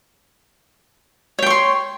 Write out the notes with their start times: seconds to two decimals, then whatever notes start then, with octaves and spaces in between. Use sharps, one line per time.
1.39 C#5
1.43 G5
1.46 C#6
1.50 C6